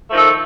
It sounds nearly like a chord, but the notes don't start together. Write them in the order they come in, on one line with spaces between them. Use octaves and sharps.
A3 F3 D#3 A4